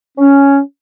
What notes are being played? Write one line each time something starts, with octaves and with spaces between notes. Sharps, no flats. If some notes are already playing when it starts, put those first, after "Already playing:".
C#4